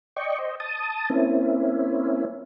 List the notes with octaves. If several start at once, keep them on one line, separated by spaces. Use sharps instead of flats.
D5 D#5 G5 C#6
C5 D#5
A5 D#6
A#3 C4 C#4 E4